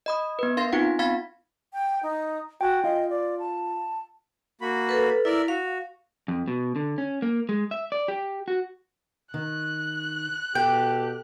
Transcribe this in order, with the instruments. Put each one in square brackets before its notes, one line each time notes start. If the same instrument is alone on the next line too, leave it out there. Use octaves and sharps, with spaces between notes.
[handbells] D#5 B5 D#6
B3 B4
D4 A#4 F5 C6 A6 A#6
C4 D#4 F4 F#5
B3 F5 B5 G#6 A6 B6
[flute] G5
D#4
[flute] F#4 [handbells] G5 G#5
[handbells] F4 F5 [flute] D#5
[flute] D5
A5
[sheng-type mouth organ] A#3 F#4 B5
[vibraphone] A4 B4
[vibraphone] E4 [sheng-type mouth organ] A#4 D5 E5
[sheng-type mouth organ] F#4 [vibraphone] F5
[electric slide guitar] F2
B2
D3
C#4
A#3
G#3
E5
D5
G4
F#4
[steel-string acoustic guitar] D#3 [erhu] F#6
[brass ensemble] B2 G4 [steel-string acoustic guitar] A4 [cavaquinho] G5